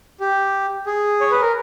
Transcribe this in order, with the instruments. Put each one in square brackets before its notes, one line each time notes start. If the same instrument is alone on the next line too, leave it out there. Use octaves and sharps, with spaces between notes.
[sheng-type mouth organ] G4
G#4
C#5
B4
A#4